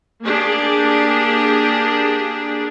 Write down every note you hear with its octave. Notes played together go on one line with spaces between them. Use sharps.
A#3 D4 G4 G#4